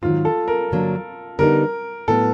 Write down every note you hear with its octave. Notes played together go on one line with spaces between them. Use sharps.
G#2 D#3 F#3 F4
A4
A#4
G2 D3 F#3 A#3 D4
D3 G3 B3 D#4 A#4
A2 F#3 B3 A4